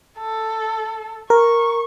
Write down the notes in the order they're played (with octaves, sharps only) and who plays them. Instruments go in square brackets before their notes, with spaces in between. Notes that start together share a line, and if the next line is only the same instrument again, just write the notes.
[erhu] A4
[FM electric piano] A#4 [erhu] C#6